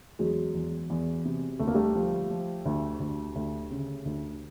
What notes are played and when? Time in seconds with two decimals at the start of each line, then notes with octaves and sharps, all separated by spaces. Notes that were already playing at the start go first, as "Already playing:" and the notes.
0.19 E2 F#3 G#3
0.54 E2
0.90 E2
1.25 C3
1.59 D2 A3
1.67 A#3
1.74 G3 A3
1.95 F3
2.31 F3
2.65 D2
3.00 D2
3.35 D2
3.71 C#3
4.05 D2